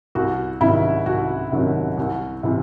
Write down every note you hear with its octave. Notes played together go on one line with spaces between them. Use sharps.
C2 F#4
C3 D#3 F#3 E4
C2 F#4
C3 D#3 F#3
C2
C3 E3